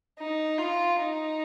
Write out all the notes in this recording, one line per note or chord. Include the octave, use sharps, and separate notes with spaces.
D#4
F4
D#4